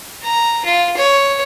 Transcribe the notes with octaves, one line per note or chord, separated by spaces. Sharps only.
A#5
F4
C#5